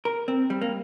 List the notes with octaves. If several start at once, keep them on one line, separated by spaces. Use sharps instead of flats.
A#4
C4
G3
A#3